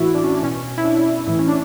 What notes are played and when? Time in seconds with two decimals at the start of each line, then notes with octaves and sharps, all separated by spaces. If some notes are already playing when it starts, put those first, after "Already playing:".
Already playing: A2 E3 E4 F#4
0.15 D4
0.24 C#4
0.32 D4
0.43 B2 C#4
0.78 E4
0.85 D4
1.26 A2 E3 E4
1.39 C#4
1.48 D4